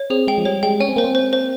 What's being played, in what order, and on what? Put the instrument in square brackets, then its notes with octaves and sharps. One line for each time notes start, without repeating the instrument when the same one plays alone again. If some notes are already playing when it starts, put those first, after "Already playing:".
Already playing: [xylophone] C#5
[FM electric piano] C4 [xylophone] G#4
[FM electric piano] G#3 [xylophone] G5
[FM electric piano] F3
[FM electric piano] G3 [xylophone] C#5
[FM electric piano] G#3 [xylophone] G5
[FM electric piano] C#4 [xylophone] G#5
[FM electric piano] C4
[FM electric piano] A#3 [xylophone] C5
[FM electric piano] C4
[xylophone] C5
C5